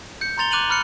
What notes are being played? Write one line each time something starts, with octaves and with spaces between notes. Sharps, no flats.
G6 C#7
A#5 C6 A6 F7 G7
D6 F#6 D#7 F7 F#7
B5 F6 F#6 C#7